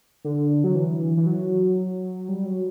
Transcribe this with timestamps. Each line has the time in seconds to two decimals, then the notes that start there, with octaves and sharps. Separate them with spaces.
0.24 D3
0.64 F#3
0.75 E3
1.17 E3
1.26 F#3
2.29 G3
2.46 F#3